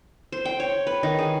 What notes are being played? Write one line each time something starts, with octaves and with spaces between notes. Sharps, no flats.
C5
G5
C#5
B4
D#3
G#4